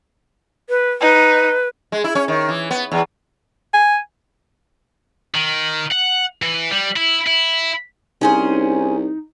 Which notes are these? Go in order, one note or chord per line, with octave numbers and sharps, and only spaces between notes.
B4
D#4 B4
G#3
E4
C#4
D#3
E3
B3
E2
G#5
D#3
F#5
E3
G3
E4
E4
C2 C#4 D#4 G#4 C5